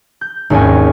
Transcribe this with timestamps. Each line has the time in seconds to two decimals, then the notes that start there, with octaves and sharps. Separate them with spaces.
0.21 G6
0.50 G#1 D#2 C#4 D#4 G#5